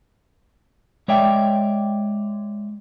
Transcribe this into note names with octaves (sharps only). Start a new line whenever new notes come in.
G#3 C#5 D5 E5 G5